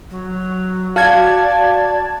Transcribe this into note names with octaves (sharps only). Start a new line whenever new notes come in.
F#3
F#4 D5 F5 A5 G#6